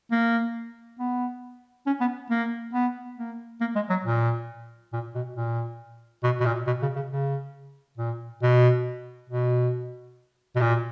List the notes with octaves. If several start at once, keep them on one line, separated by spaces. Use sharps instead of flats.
A#3
B3
C#4
B3
A#3
B3
A#3
A#3
G#3
F#3
A#2
A#2
B2
A#2
B2
B2
A#2
B2
C#3
C#3
C#3
A#2
B2
B2
B2
A#2